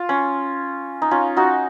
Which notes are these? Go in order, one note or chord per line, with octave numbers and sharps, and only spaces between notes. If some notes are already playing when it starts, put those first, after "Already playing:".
Already playing: F4
C#4
D#4
C#4 F4
D#4 F#4